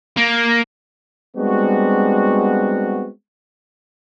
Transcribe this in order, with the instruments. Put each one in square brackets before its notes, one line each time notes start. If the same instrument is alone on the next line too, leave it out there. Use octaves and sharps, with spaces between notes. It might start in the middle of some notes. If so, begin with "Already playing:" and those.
[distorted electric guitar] A#3
[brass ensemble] G3 G#3 B3 C4 D4 F#4